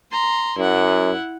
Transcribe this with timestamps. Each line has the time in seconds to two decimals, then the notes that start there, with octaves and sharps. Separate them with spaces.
0.11 A#5 C6
0.58 F#2 E4 F#5